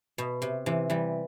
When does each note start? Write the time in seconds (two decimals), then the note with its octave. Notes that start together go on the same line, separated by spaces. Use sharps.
0.18 B2
0.42 C3
0.66 C3 E3
0.90 E3 G3